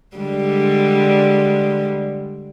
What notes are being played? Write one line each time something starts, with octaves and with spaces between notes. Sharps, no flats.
D3 G3 G#3